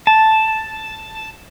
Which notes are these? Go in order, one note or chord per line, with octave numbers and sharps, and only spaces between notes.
A5